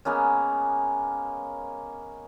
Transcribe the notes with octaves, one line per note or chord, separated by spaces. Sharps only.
G#3 A#3 B3 C#4